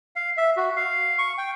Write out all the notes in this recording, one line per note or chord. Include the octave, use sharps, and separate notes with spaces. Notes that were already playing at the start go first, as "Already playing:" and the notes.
F5
E5
F#4
F5
C#6
G5